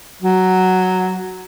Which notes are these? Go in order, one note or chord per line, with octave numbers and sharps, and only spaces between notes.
F#3